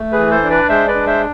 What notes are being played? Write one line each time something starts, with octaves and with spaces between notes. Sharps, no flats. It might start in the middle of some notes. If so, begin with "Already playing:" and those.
Already playing: A3
G#4 B4
E3
A4 C5
D4
B4 D5
G#3 C5 E5
B4 D5
D4
C5 E5